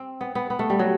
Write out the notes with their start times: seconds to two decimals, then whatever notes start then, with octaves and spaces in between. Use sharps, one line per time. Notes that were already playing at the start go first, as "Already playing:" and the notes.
Already playing: C4
0.21 B3
0.35 B3
0.50 B3
0.59 A3
0.70 G3
0.79 F#3